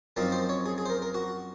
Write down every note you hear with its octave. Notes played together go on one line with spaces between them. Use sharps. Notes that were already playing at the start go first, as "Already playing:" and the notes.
F#2 F3 C4 D#4 A#4
C5
C#5
G#4
G#4
C5
A#4
A#4
F#4